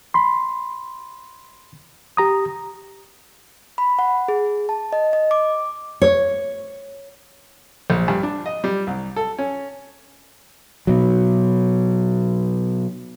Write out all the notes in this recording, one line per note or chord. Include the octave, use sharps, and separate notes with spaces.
B5 C6
G4 A#5 D#6
B5
F#5
G#4
A5
D#5
D#5
D6
C#5
A#1
G2
D4
D#5
G3
C2
A4
C#4
B2 F#3